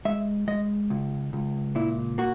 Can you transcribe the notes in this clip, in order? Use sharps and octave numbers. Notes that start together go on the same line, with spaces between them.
G#3 E5
G#3 D#5
C#2
C#2
A#2 E4
A#3 F#4